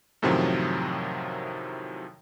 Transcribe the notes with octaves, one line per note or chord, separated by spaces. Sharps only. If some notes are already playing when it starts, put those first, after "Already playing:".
F#2 A2 C3 D#3 F3 F#3